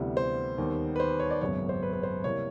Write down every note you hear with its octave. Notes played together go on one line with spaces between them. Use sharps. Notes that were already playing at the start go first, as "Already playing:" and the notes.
Already playing: D2 C3 E3 G3 B3
C5
D#2 D#3 G3 B3
B4
C5
C#5
D5
G#1 F#2 C#3 F#3 B3 C#5
C5
B4
B4
C5
C3 E3 G3 A#3 C#5